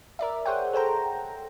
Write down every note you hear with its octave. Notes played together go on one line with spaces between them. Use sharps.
A#4 D5 E5
G#4 C5 C#5 F#5 G5
A4 C5 G5 A#5